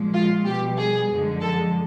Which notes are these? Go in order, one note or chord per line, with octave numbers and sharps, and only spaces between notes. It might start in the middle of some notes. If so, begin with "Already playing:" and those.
Already playing: A#2 F3 G#3
F4
B2 G3 G4
G#4
F#2 D3 F3 G#3
A4